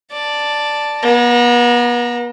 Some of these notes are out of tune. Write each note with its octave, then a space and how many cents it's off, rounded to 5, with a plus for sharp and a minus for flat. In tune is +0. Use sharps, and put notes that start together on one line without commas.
D5 +0 A5 +0
B3 -40 A#5 +0